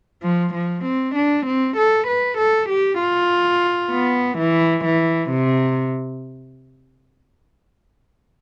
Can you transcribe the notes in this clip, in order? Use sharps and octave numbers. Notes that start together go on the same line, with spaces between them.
F3
F3
C4
D4
C4
A4
B4
A4
G4
F4
B3
E3
E3
C3